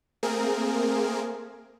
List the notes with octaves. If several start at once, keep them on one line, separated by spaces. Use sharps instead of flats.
A3 A#3 C4 G#4 A#4